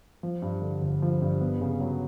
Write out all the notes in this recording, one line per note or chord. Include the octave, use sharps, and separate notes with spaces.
F3
G2
D3
G1
F3
G2
B3
C#3
F#3